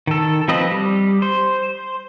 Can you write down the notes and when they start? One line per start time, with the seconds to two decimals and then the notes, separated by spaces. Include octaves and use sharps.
0.07 D#3 A4
0.48 F3 C4 B4 D#5
0.71 G3
1.22 C5